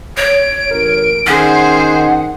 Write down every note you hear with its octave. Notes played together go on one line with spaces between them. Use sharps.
C#5 D7
A1 A#4
D#3 C#4 G#4 C5 F#5